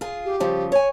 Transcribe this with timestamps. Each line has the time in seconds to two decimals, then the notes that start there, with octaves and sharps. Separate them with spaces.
0.01 F4 G#4
0.25 G4
0.40 C#3 F3 G3
0.72 C#5 G#5